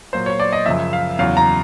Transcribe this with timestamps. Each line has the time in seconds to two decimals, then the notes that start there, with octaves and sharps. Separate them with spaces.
0.13 A#2 F#3 C5
0.26 C#5
0.40 D5
0.53 D#5
0.66 F#2 C#3 F3 E5
0.93 F5
1.19 E2 C#3 F#3 F5
1.37 A#5